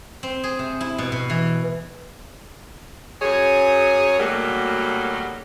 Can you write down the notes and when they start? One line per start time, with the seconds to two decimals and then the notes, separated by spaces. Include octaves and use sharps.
0.23 C4
0.44 G#4
0.59 C3
0.81 E4
0.98 B2
1.12 B2
1.30 E3
3.21 F#2 G#4 C#5
4.19 B2 D#3 F#3 G3 A3 A#3